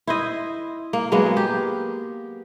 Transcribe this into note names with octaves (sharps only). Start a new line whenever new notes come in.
E4 C5 D#5
A#3
F#3 G#3 A#3 B3
G4